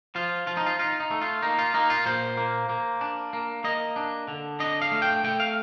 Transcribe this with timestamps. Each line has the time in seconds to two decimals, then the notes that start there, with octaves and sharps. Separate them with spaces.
0.15 F3 F4
0.47 F3 F4
0.57 D#4
0.66 F4
0.79 D#4 F4
1.00 D#4
1.11 A3
1.22 F4
1.42 A#3 D#4
1.58 F4
1.74 A#3 D#4
1.90 F4
2.06 A#2 C5
2.37 A#3
2.69 A#3
3.01 D4
3.33 A#3
3.64 A#3 D#5
3.96 D4
4.28 D3
4.60 D4 D#5
4.82 F5
4.92 A3
5.02 G5
5.24 A3 G5
5.40 F5